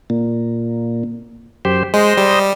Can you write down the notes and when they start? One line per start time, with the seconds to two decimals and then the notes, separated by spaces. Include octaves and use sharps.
0.10 A#2
1.65 F#2 G4 C5
1.94 G#3 C5 D#5
2.17 G3